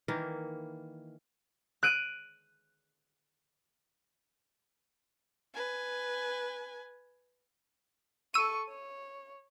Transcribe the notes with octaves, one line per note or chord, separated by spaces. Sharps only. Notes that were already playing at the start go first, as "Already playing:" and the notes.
D#3 E3 A#3
F#6 D7 D#7
B4 G#5
A4 C#6 E6 D#7
C#5